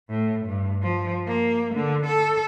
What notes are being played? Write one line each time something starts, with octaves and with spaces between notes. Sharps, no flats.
A2
G2
F3
A#3
D3
A4